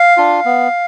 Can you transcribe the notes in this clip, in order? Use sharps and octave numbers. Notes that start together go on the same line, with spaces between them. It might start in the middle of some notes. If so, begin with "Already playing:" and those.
Already playing: F5
D4 F4
B3